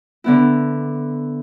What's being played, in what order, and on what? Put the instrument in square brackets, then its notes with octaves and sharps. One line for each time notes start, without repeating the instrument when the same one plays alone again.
[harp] D3 B3 E4